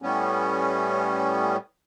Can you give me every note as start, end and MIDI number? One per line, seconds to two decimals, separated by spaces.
0.02 1.57 45
0.02 1.57 55
0.02 1.57 59
0.02 1.57 61